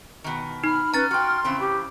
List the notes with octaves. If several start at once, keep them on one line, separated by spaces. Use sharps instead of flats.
B2 D#3
D#4 B5 F6
C#4 B4 A#5 A6
F#4 G5 C6
C#3 E3 C4
G4